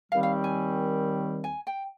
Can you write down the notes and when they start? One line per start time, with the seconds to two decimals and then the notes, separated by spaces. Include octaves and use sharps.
0.11 D#2 D#3 G3 C4 F5
0.23 F5
0.44 G#5
1.44 G#5
1.67 G5